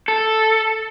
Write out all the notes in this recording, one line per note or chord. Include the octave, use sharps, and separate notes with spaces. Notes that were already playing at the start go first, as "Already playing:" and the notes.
A4